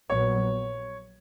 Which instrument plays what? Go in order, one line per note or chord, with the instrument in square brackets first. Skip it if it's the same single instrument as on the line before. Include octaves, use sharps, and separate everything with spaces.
[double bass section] A#1 A#2 F#3 B3 [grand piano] C#5